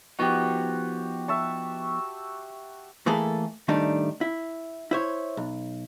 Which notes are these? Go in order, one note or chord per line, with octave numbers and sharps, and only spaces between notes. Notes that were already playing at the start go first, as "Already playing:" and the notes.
F3 B3 D#4 F#4 G4
E5 A5 C#6
E3 A3 A#3 G#4 A4
A2 D#3 G3 A3 D4 D#4
E4
E4 C5 C#5
B1